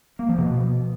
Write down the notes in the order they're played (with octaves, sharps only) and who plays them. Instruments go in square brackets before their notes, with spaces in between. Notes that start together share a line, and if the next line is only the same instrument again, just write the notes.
[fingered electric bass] A#3
F3
B2